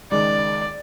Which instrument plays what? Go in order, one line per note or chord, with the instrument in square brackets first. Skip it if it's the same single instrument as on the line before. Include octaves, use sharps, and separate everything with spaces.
[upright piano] C#2 D#3 G#3 [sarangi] D5